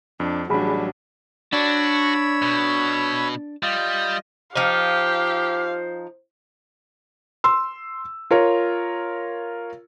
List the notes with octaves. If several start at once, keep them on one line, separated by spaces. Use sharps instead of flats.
F2 D4
A1 F#3 G3 D4 G#4 B5
D4 F#4 C#5 B5 E6
B2
G3 F4 D#5
F3 D#4 G4 C5 F5
C6 E6
F4 A#4 C#5